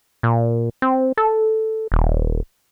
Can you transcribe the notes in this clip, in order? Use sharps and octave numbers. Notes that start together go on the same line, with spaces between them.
A#2
C4
A4
D#1